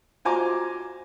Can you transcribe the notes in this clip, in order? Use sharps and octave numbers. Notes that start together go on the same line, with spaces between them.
F4 F#4 C5 G#5 A#5 D6